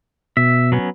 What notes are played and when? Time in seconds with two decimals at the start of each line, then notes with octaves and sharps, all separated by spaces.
0.37 B2 E5
0.72 F#3 B3 C#4